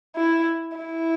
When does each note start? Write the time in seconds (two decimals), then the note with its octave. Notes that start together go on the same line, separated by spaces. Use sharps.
0.16 E4
0.77 E4